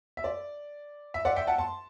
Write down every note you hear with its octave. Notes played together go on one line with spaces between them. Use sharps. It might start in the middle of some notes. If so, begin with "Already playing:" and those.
E5
D5
E5
D5 F#5
E5 G5
F#5 A5
A5 C6